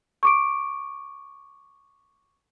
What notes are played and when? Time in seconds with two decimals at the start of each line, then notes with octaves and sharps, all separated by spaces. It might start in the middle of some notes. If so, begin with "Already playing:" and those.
0.23 C#6 D6 D7